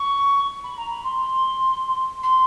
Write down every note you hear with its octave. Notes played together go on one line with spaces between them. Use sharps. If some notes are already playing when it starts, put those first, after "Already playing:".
Already playing: C#6
B5
A#5
B5
C6
C6